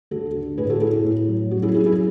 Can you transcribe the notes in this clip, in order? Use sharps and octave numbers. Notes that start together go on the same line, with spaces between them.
D2 F#4 A4
D3
A2 G#4 B4
F#4 A4
A3 E4 G#4
E4
A2
F#3
F#2 F#4
E4 G#4
F#3 E4 G#4
E4 G#4